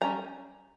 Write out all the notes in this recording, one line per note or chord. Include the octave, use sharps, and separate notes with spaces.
G3 C#4 A#5